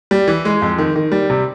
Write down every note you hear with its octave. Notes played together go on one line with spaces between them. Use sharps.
G3
E3
G#3
F2
D#3
D#3
G3
C3